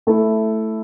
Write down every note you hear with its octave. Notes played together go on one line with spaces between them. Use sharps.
A3 E4 A4